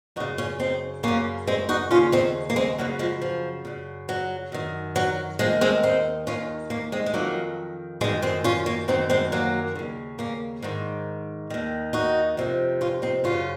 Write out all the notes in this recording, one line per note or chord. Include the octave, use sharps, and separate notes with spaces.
F#2 C#3 D#4 F#4
C#4 F4
C4 D#4
F#2 C#3 A#3 C#4
G#3 C4
D#4 F#4
D#2 C#3 C#4 F4
C4 D#4
A#3
G#3 C4
F#2 C#3 F#3 A#3
F3 G#3
F3
F#2 C#3
F#3
F#2 D#3
F#3
D#2 D#3 F3 G#3
G#3 C4
C4 D#4
D#2 D#3 C#4 F4
A#3 C#4
G#3 C4
G#3
F2 D#3 F#3 A#3
F#2 D#3 F3 G#3
G#3 C4
C#4 F4
A#3 C#4
F#2 D#3 C4 D#4
G#3 C4
F#3 A#3
D#2 C#3
A#3 C#4
G#2 D#3
D#2 D#3
D#4 F#4
F2 C3 D#3
C#4 F4
C4 D#4
F#2 C#3 C#4 F4